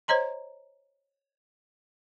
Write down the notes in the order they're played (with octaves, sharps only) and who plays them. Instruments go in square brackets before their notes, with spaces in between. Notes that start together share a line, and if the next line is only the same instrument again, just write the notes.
[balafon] C5 C#5 D#5 A#5 C6